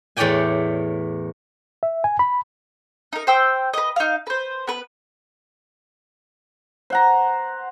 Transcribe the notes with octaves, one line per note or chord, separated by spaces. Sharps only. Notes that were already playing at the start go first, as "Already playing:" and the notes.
E2 A2 C#5 D5 G5 G#5
E5
G#5
B5
D#4 A#4
C5 G5 E6
B4 D#5
D#4 F5
B4 C5
B3 B4
C5 F#5 A#5